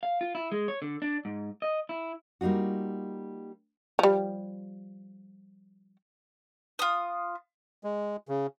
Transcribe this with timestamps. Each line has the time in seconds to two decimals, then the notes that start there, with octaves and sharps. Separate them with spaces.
0.03 F5
0.21 F4
0.35 E4
0.52 G#3
0.68 C#5
0.82 D3
1.02 D4
1.25 G#2
1.62 D#5
1.89 E4
2.41 G3 A#3 D#4 F4 F#4
3.99 F3 G3
6.79 F4 D#6
7.84 G#3
8.28 C#3